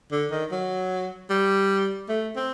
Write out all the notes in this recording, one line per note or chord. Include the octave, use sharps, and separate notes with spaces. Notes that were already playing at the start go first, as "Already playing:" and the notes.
D3
D#3
F#3
G3
A3
C4